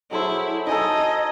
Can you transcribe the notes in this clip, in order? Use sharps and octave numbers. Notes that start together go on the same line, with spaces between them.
F#3 E4 G#4 A4 C5
D#4 G#4 A4 D#5